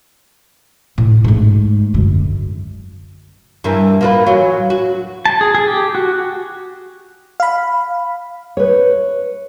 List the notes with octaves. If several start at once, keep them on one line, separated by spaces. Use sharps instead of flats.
A2
G#2 A3
F#2 D3
G2 E3 A#3
A#3 F4 B4
E3 F#3
F#4
A5
G#4
G#4
G4
F#4
F5 B5
B4 C#5